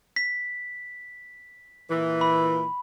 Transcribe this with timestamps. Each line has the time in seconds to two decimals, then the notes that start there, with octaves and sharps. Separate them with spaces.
0.16 B6
1.90 A#2 E3
2.21 B5